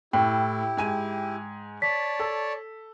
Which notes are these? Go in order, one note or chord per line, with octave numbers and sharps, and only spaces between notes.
A2 E4 G4 G5
G#2 G#5 D#7
C#5 D5 A5 B6
A4